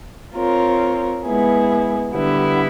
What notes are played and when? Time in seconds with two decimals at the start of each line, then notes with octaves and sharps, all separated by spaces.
0.35 C4 F4 A#4 C#5
1.23 G#3 B3 E4 G#4
2.12 D3 G3 B3 E4